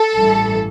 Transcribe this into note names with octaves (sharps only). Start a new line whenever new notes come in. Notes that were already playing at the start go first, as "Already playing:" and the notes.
Already playing: A4
A1 G2 E3